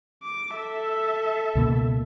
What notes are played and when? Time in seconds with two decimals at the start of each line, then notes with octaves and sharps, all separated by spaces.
0.23 D6
0.56 A4 E5
1.55 C#2 B2 A#3